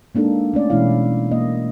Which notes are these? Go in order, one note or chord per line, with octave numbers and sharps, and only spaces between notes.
G#3 A#3 D4 D#4 A4
A3 C#4 D5
B2 E3 G#3 C#4 E4 F5
A#3 D#5